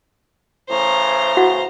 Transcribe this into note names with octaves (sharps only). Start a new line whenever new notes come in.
A2 C#3 E3 C5 A#5
E4 F#4 F#5